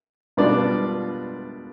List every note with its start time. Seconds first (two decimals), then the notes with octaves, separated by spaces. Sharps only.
0.37 B2 G3 B3 D4 F4 D5